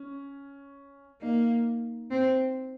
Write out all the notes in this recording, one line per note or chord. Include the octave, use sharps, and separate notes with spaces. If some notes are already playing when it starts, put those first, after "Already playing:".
Already playing: C#4
A#3 D#4
C4